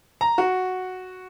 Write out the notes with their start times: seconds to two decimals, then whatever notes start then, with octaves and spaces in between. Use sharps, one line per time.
0.21 A#5
0.38 F#4